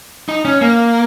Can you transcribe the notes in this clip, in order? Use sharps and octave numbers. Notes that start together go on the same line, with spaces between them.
D#4
C#4
A#3